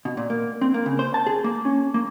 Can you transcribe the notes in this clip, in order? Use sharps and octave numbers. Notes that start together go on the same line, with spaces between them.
B2
A#2
A#3
C4
A#3
C#3
C5
A5
G#4
A#3
C#4
A#3